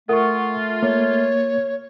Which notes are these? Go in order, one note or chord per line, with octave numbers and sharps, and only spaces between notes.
A3 F4 A#4 F#5 C#6
A#3 C#5